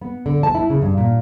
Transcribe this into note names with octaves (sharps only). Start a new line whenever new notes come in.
B3
D3
A5
E4
C#3
G2
A#2